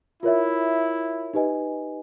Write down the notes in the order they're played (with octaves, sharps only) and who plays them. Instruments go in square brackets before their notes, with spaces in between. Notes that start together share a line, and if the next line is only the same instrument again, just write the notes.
[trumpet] E4 [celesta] F4 A#4 C#5 E5
[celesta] D#4 G4 B4 D#5 G#5